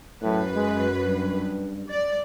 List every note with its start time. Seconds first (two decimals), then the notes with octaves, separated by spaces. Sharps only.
0.22 F#2 A2 B4
0.55 G#3
1.06 G2
1.89 D5